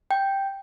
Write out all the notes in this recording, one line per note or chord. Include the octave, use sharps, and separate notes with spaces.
G5